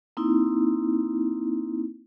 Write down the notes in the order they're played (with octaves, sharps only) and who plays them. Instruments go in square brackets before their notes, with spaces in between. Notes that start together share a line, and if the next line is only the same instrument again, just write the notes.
[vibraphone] A#3 C4 D#4 E4